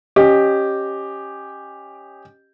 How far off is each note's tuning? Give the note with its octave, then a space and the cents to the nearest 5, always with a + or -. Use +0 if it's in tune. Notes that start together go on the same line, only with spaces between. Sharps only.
C#4 -15 G4 +0 D#5 -20